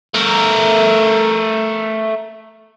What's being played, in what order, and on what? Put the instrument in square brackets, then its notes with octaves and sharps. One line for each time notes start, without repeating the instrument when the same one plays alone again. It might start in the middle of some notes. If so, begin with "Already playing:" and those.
[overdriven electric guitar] A3 A#4